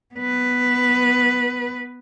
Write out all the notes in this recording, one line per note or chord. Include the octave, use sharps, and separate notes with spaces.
B3 B4